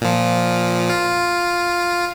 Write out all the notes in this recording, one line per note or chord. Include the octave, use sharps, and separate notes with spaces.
A#2 F3
F4